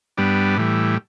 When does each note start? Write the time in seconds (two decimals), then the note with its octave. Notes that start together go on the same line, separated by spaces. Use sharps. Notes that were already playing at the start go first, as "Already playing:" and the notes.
0.17 G2 G3 B3 D4
0.57 A2 E3 G3